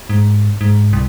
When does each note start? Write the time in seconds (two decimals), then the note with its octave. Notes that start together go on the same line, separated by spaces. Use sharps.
0.09 G#2
0.61 G#2
0.93 C2